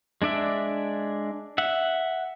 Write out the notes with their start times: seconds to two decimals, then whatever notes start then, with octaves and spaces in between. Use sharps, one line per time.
0.22 G#3 D4 D5 E5
1.58 E5 F#5